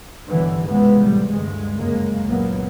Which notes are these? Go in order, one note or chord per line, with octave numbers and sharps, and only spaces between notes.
G2 B2 D3 E3 F#3 G3
C#2 G#2 C3 E3 G#3 B3
A2 C3 G3
D2 G2 G#3
F#2 C#3 G#3 A#3
C#2 A#2 F#3 A#3 B3